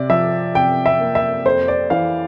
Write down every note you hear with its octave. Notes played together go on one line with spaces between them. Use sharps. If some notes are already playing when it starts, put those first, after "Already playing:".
Already playing: C3 D5
F3 E5
C3 G5
E5
A#3
E5
F2 C5
D5
E3 F5